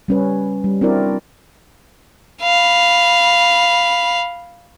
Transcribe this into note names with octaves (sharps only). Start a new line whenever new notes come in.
G3 C#4 B4
G3
C4 D4 E4 F#4 A#4 D5
F5 B5